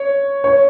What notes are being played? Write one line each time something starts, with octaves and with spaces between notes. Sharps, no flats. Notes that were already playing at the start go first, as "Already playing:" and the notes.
Already playing: C#5
C#5